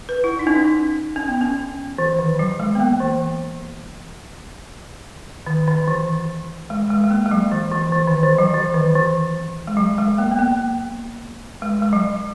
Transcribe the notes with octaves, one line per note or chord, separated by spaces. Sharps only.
B4
E4
D#4
C#4
D#4
C#4
B3
C#4
E3
D#3
F#3
G#3
B3
A#3
E3
D#3
D#3
E3
G#3
G#3
G#3
A#3
G#3
F#3
E3
E3
E3
D#3
E3
F#3
E3
D#3
E3
G#3
F#3
G#3
A#3
B3
A#3
G#3
G#3
F#3